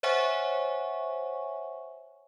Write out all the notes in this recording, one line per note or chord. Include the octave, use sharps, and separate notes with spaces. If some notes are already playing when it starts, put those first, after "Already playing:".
C5 C#5 E5 F#5 G#5 C#6